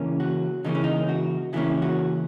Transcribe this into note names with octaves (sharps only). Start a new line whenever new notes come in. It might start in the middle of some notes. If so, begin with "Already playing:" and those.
Already playing: C#3 E3 A#3 C#4
F#4
C#3 E3 A#3 C#4 D#4
C#4
D#4
F#4
C#3 E3 A#3 C#4 E4
F#4